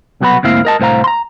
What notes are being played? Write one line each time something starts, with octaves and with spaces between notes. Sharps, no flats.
C2 B2 F#3 B3 F#4 B5
D2 G#2 A#3 C4 E4 F5
A#4 D#5 A5
C2 A2 C5 F5 A#5
A#5 C6